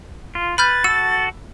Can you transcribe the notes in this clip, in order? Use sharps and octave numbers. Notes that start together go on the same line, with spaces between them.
F4
B4 B5 F6 G6 A6
F#4 A4 E6